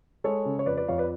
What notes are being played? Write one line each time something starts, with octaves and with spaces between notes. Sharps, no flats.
G#3 A4 C#5
C#3
C#5
F2 B4 D5
B4 D5
F2 C#5 F5
B4 D5